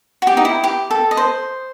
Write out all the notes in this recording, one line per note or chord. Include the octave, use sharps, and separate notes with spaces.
F#4
G4
D#4
E4
G4
A4
D#5
C5